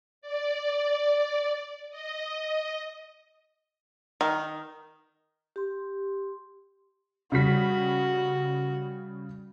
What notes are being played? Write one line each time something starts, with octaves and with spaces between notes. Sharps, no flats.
D5
D#5
D#3
G4 C6
C#3 G3 F#4 B6